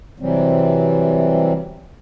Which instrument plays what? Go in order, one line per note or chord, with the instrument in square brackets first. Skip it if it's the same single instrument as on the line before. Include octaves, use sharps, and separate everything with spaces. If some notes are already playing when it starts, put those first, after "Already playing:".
[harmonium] C3 E3 F#3 G3 C4